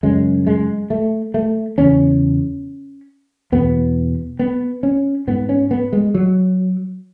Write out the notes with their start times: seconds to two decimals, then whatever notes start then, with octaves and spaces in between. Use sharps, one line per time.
0.03 F#2 C#3 G#3
0.47 G#3
0.90 A3
1.34 A3
1.78 E2 C#3 C#4
3.52 E2 B2 B3
4.39 B3
4.83 C#4
5.27 G#2 B3
5.49 C#4
5.71 B3
5.93 G#3
6.14 F#3